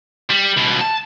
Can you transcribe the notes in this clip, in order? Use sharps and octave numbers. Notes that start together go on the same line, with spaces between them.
G3
C#2 B2
A5